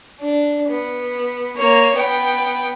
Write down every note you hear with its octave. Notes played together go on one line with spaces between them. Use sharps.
D4
B3
A#3 C#5
B3 G5